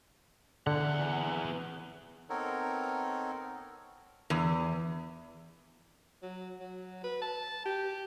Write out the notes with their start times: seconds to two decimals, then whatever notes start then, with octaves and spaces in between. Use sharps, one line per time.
0.67 E2 D3 F#5
2.30 B3 C4 D#4 A4 A#4 C#5
4.30 E2
6.23 F#3
6.60 F#3
7.04 B4
7.22 A5
7.65 G4